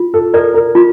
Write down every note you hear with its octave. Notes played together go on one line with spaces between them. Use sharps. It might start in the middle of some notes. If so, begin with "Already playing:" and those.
Already playing: F4
A4
A4 A#4 D5
A#4
F4